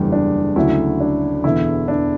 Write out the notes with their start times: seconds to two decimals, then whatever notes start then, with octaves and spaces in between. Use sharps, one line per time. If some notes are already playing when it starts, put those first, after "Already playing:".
Already playing: F#1 E2 D3 G3
0.12 D4
0.56 D2 C#3 F#3 A3 E4
1.00 D4
1.44 E1 E2 D3 E4
1.88 D4